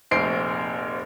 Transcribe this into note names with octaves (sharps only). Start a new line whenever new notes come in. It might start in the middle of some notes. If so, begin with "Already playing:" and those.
F1 A#1 C5 C7 D7